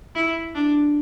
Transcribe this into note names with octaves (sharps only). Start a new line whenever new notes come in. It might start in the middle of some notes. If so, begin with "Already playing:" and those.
E4
D4